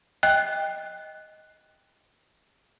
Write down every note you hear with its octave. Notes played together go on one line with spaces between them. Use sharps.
D#5 G5 F#6